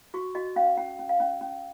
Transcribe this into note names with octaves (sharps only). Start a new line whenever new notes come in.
F#4 C#6
F#4 D#5
C#4 F5
C#4 F#5
C#4
F5
C#4
C#4